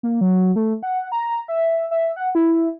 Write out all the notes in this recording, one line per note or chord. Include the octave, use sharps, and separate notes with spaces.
A#3
F#3
A3
F#5
A#5
E5
E5
F#5
E4